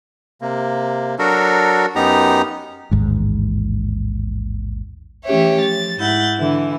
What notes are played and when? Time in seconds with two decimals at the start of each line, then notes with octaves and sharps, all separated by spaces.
0.42 C3 A#3
1.19 F#3 D4 F#4 A4 A#4
1.95 F#2 B3 D#4 G4 A#5
2.91 A1 D#2 G#2
5.26 E3 A3 C#4 G4 C#5 E5
5.62 F3 A6
6.00 G#2 E4 F#5 G6 A6
6.37 D3 E3 E4